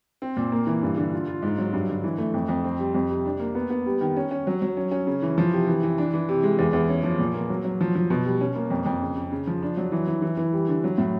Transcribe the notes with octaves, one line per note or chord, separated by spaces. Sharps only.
C4
A#2
A#3
E3
G2
D3
F4
F4
G#2
F#3
G2
D3
E3
A3
F2
F2
C4
G3
F2
C3
D4
A#3
B3
B3
G3
D#3
C#4
C#4
F#3
F#3
C#4
C#4
C#3
E3
F3
C3
E3
E3
D4
E3
C3
G#3
E2
E2
C#4
F3
A#2
A#3
F#3
F#3
F3
F3
B2
G3
C#4
A#3
F2
F2
C#3
C#3
C#3
F3
D4
F#3
E3
E3
E3
E3
G3
D3
F#3
A2